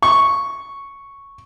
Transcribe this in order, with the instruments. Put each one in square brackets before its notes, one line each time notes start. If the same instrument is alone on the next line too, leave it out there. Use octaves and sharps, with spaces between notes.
[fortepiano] C#6